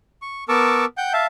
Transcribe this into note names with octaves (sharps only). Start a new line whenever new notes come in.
C#6
B3 A#4 A5 C#6 D6 E6
F#5 G5 G6
E5 F5 A5